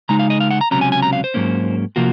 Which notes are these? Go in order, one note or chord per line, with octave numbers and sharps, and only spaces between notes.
C#3 G#3 D#4 A#5
F5
D#5
F5
F#5
A#5
C#2 C3 F#3 C#4 A#5
G#5
G#5
A#5
F5
C5
G#2 F#3 A#3 C#4
C3 F3 A#3 F4 F#4